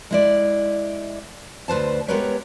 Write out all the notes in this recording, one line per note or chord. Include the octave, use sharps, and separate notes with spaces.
G#3 E4 D5
D2 B4 C5 A5
G#3 B3 G4 A#4 B4 C#5